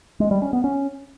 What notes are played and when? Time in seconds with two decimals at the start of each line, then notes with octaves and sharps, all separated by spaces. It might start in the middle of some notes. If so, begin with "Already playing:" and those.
0.20 G#3
0.31 G3
0.42 C#4
0.53 B3
0.64 C#4